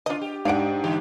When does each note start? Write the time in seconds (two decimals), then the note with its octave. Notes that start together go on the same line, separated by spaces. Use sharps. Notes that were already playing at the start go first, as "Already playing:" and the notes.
0.06 C#3 D4 F4 D#5
0.21 G4
0.45 G#2 D4 F5 F#5 D7
0.84 D3 E3 D#4 G4